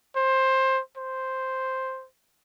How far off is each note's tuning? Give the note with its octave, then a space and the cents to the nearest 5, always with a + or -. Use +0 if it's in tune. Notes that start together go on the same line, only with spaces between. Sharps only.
C5 +15
C5 +0